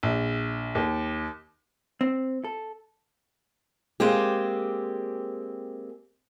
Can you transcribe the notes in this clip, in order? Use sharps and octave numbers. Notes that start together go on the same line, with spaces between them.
A#1
D#2
C4
A4
G#3 A#3 C4 G4